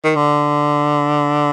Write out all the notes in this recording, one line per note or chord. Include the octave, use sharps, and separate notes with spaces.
D#3
D3